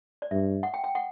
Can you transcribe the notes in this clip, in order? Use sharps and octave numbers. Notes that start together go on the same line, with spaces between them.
D5
G2 E5
F#5
G5
G5
F#5